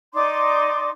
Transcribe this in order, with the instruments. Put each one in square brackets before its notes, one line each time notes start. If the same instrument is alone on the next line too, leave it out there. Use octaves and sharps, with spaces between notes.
[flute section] D#4 D5 C6 D6